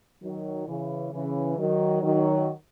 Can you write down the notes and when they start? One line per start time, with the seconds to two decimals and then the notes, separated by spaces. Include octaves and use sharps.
0.22 D#3 F#3
0.67 C#3 E3
1.13 C#3 E3
1.58 D#3 F#3
2.03 D#3 F#3